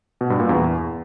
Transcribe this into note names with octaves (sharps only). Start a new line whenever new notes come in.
B2
G2
A#2
E2